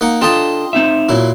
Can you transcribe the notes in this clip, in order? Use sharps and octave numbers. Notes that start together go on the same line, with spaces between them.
A#3 D#4 F#5
D4 F4 A4 D#5 G5 D#6
C4 D#4 E5
A#2 F#3 E4